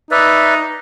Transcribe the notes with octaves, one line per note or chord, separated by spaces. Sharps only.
D#4 B4 D5 E5